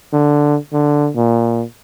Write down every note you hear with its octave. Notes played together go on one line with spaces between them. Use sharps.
D3
D3
A#2